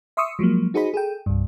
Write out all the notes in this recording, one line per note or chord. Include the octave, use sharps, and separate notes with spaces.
E5 C6 C#6 D#6 E6 C#7
F3 F#3 G#3 A#3
D#4 F#4 G#4 C5 D#5 B5
G#4 A4 G5
C2 G2